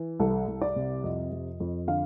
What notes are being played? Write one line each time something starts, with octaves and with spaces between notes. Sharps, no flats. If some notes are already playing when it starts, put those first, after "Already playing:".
Already playing: E3
C2 A4
C2
D5
C3
F2 D#5
F2
F2
D3 F5